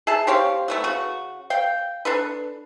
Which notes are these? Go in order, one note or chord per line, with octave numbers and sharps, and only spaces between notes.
G#4 E5 A5
C4 G4 C#5 F5
A3 B3 F#4
C#3 F#4
F5 G5
D4 A4 B4